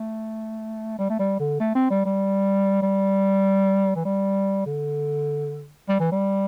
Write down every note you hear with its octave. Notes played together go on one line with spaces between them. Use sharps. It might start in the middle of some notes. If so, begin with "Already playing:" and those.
Already playing: A3
G3
A3
G3
D3
A3
C4
G3
G3
G3
E3
G3
D3
G3
E3
G3